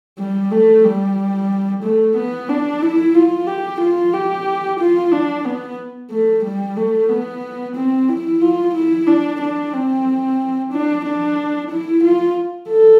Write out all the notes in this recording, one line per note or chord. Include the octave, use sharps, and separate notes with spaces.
G3
A3
G3
A3
B3
D4
E4
F4
G4
F4
G4
F4
D4
B3
A3
G3
A3
B3
C4
E4
F4
E4
D4
D4
C4
D4
D4
E4
F4
A4